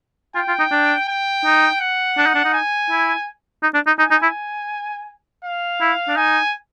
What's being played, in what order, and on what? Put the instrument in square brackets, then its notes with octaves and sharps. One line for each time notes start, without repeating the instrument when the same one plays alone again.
[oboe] F4 [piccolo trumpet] G5
[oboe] F4
D#4
D4
[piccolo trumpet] G5
[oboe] D#4
[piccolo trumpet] F#5
[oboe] D4
D#4
D4
D#4
[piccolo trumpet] G#5
[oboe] E4
D#4
D4
D#4
[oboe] D#4 [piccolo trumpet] G#5
[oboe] D#4
E4
[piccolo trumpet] F5
[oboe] E4
D4
[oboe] D#4 [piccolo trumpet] G#5